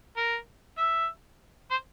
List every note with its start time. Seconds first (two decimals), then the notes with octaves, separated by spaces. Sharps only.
0.17 A#4
0.78 E5
1.71 C5